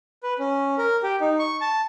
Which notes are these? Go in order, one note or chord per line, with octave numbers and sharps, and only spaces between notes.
B4
C#4
A#4
G4
D#4
C#6
A5